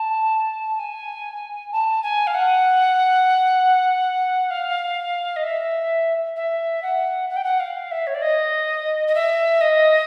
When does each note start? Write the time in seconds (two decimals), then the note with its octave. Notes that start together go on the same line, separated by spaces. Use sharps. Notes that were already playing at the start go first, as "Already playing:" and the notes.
Already playing: A5
0.79 G#5
1.72 A5
2.03 G#5
2.27 F5
2.34 F#5
4.51 F5
5.36 D#5
5.43 E5
6.36 E5
6.83 F#5
7.30 F#5
7.36 G5
7.44 F#5
7.60 F5
7.91 E5
8.07 C#5
8.14 D5
8.22 D#5
9.07 D#5
9.15 E5
9.61 D#5